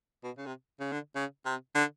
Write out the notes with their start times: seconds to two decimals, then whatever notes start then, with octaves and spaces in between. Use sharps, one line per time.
0.24 B2
0.38 C#3
0.46 C3
0.80 C#3
0.92 D3
1.16 C#3
1.46 C3
1.75 D3